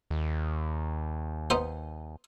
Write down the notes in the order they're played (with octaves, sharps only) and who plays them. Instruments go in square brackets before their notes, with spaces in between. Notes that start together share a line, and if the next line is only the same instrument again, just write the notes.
[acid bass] D#2
[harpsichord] B3 D#4 C5